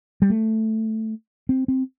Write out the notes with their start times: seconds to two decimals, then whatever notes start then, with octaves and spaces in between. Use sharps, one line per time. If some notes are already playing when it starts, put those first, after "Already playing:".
0.22 G3
0.30 A3
1.49 C4
1.68 C4